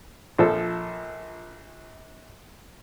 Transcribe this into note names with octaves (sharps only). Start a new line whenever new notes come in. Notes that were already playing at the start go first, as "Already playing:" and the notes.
A#1 F3 A4